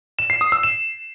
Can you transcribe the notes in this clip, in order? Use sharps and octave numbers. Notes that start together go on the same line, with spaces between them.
E7
C7
D#6
E6
E7